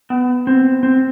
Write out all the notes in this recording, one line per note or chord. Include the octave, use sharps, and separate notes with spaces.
B3
C4
C4